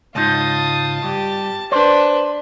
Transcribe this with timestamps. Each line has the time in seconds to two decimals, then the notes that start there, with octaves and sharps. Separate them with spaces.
0.15 C#2 G#2 D#4 F4 A5 D#6
1.04 G2 G4
1.72 D4 B4 C5